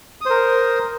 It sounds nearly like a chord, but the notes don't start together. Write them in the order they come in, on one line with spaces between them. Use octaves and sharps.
D#6 C5 A#4